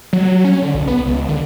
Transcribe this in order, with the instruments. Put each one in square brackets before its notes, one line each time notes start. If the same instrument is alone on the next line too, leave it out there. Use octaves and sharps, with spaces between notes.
[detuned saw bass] F#3
C#4
D3
B1
B3
C#2
D3